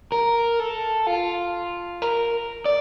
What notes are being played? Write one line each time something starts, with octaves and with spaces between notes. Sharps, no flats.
A#4
A4
F4
A#4
D5